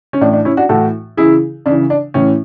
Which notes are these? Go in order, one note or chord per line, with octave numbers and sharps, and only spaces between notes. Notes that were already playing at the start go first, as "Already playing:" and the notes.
C#4
A2 E3 D4
D4
C#4 E4
D4 F#4
A2 E3 F#4 A4
C#3 E3 E4 G#4
C#3 E3 D4
D4
A2 E3 C#4